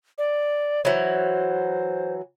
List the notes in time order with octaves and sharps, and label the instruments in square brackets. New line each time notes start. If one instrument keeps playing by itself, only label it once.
[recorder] D5
[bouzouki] E3 F#3 [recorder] C5